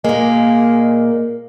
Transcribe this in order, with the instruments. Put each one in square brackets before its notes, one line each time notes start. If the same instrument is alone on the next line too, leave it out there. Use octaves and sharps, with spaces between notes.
[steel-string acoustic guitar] A#2 A#3 [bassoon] G#3